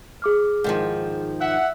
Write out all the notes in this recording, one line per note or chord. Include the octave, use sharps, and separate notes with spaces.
G#4 D6 F6
G#2 D#3 F3
E5 F#5